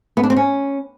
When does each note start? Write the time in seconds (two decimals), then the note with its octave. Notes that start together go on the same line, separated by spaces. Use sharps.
0.17 B3
0.23 D4
0.30 C4
0.37 C#4